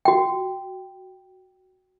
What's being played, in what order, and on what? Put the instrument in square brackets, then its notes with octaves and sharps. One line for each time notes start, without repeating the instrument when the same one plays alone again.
[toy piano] F#4 G5